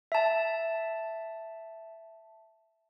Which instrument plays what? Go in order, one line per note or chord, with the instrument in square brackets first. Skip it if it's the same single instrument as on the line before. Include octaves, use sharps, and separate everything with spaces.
[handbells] E5 A5